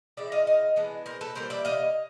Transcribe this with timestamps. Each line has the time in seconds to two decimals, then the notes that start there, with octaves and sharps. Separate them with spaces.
0.17 E3 G#3 C4 D5 E5
0.32 D#5 F5
0.47 D#5 F5
0.76 E3 G#3 B3 D4
1.06 A#4 C5
1.21 A4 B4
1.35 E3 G3 A#3 A#4 C5
1.50 D5 E5
1.65 D#5 F5